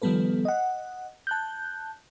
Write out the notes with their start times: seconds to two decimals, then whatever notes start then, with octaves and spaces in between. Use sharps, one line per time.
0.02 D#3 F3 G3 B3 A4 B4
0.45 D#5 F#5
1.27 A5 F#6 G6